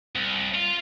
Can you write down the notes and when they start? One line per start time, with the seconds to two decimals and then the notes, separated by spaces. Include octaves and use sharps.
0.16 C2
0.55 F4